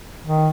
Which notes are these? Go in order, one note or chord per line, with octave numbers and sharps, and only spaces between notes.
D#3